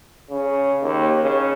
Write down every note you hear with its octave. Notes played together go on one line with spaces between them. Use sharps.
C#3
D#2
C#3